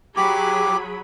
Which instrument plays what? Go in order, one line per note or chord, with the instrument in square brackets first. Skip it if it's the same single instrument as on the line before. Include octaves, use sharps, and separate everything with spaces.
[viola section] F#3 G#4 B5 [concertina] G4 D6